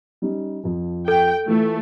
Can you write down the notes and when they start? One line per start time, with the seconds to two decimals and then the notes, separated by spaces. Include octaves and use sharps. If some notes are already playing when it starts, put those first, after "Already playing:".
0.22 G3 C#4 D#4
0.63 F2 F3
1.08 A4 G5
1.47 E3 A3 F4